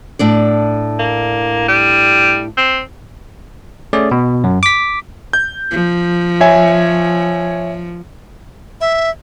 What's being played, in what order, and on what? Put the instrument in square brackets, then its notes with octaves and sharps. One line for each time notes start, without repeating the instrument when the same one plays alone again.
[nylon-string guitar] A2 D4 D5
[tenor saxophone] A#3
G3
C4
[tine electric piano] A3 C#4 G#4 D5
B2
F#2
D6 B6
[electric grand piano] G6
[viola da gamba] F3
[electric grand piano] C#5 E5 G#5
[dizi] E5